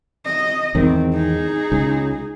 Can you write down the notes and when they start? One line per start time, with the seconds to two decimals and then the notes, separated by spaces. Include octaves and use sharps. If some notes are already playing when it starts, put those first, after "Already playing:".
0.25 D#5
0.75 E2 G#2 D#3 C4
1.13 D#4 G#4
1.72 C#2